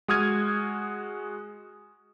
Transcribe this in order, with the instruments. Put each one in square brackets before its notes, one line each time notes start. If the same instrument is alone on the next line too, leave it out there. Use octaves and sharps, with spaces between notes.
[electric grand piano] G#3 F#4 D#6 F6 G#6 D#7